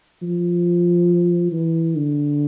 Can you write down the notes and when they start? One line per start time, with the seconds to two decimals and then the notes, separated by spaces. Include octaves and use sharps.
0.22 F3
1.52 E3
1.96 D3